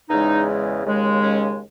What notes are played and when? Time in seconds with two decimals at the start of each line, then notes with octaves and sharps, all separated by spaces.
0.09 E2 C#3 G#3 D#4
0.85 D#2 C#3 G#3
1.22 C#4